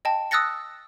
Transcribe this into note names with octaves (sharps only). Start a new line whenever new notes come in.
D#5 G5 A5
D#6 E6 F#6 A6 A#6 C#7